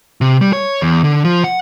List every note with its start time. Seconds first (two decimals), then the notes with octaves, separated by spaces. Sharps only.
0.21 C3
0.41 G3
0.53 C#5
0.82 E2
1.04 D3
1.25 F3
1.44 F#5